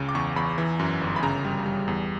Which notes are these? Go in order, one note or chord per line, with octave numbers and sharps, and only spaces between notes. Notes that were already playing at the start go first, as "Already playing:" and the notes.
Already playing: C#2 C#3
D6
E2 C#6
E2 B5
E3
F#2
G1
B5
C#3 A#5
G3
G3
E2